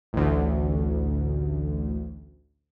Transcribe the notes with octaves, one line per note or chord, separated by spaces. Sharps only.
A1 D2